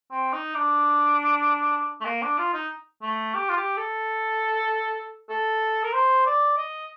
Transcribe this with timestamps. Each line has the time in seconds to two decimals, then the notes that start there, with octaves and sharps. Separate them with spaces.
0.11 C4
0.33 D#4
0.55 D4
2.01 A3
2.05 A#3
2.22 D4
2.39 F4
2.54 D#4
3.02 A3
3.35 G4
3.49 F4
3.57 G4
3.78 A4
5.29 A4
5.84 A#4
5.93 C5
6.26 D5
6.58 D#5